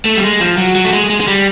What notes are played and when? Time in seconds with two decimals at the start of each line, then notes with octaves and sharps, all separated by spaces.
0.05 A3
0.16 G3
0.23 G#3
0.40 F3
0.58 F#3
0.75 F#3
0.85 A3
0.93 G#3
1.10 G#3
1.20 G#3
1.28 G3